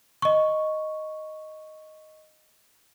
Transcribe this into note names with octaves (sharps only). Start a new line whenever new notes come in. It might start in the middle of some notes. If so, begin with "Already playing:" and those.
D#5 C#6